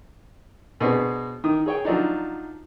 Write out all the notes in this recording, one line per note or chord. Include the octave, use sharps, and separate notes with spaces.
B2 C4 D4 G#4
D#3 D#6
G#4 C#5 G5
F3 F#3 D4 D#4